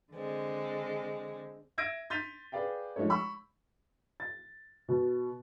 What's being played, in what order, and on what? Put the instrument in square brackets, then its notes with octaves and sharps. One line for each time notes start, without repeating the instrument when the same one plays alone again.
[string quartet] D3 G#3 C4
[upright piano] E5 E6 G#6 A#6 D7 D#7
C6 G6 A6 B6 D#7 F7
G#4 B4 D5 F5 G5
F3 G#3 A3 A4 C#5
B5 C#6 E6
A6
B2